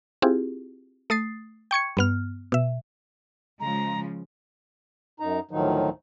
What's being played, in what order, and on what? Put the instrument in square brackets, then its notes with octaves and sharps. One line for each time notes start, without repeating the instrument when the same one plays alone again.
[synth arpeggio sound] C4 E4 F4 G4 G#4
A3 D#6 A6 C7
G5 C#6 G#6 C#7
G2 B3 F6
B2 E5
[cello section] C#3 F3 G#3 [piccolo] A#5
[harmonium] F#2 D#4 A#5
D2 A2 D#3 F3 F#3 D#4